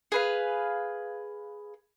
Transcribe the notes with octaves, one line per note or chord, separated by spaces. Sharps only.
G#4 B4 F5